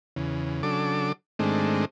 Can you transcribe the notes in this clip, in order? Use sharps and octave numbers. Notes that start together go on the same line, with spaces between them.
E2 C#3
C#3 F#3 D4 A4 D6
G#2 D#3 G#3 A3 C4 D4